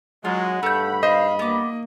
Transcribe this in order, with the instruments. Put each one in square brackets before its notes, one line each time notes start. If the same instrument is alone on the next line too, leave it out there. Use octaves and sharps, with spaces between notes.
[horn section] F#3 G#3 [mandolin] F4 [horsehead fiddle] F#5
[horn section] G2 B5 [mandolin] A3 G6
[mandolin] C5 [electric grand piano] D#5 [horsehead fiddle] F5
[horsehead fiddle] A#3 [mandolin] B3 D6